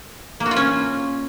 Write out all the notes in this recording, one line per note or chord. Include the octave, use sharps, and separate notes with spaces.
A#3
F#4
F4
C#4